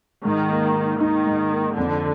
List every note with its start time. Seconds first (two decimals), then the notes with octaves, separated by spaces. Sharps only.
0.25 G#2 D#3
0.50 A#3
0.76 A#3
1.00 D#3 D#4
1.27 G#2
1.51 A#3
1.77 F2 D3